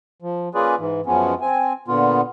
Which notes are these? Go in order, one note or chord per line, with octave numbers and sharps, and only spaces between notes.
F3
A#3 C#4 F4 G#4 B4 D5
G#2 E3
F#2 F3 G#3 B3 C#4
C4 G#5
A#2 D3 B3 F4